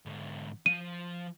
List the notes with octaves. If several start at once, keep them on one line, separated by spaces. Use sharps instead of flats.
G#2 D3
F3 D#7